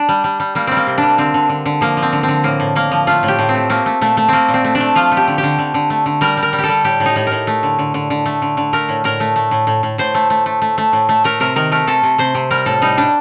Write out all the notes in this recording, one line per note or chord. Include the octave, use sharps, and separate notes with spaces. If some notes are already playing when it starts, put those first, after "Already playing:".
Already playing: D4
G3
G3
G3
G3 A#3
G3 C4
A#3
C3
G3 D4
D3 C4
D3
D3
D3
F3 A#3
F3
C4
D3
C4
D3
A2 A#3
A2
A2 A#3
F3
A3 F4
A2
G4
A2
C4
A3
A3 A#3
A3
A#2 A3
A3
A3 A#3 C4
A#2
C4
A3
D4
A3
F3 F4
A3
G4
D3
G4
D3
D3
D3
A3
D3
G3 A#4
G3
A#4
G3
G4 A4
G3
A2 G4
A2
D#4
A2
A2 A#4
A3
D3
D3
D3
D3
A3
D3
D3
A3 A#4
A2
A2 A#4
A3
A3
A2
A2
A2
A2 C5
A3
A3
A3
A3
A3
A2
A3
A3 A#4
C3 A#4
D#3 A#4
A3 A#4
C3 A4
C3
C3 C5
C3
G3 A#4
A2 A4
G3 D#4
G3 D4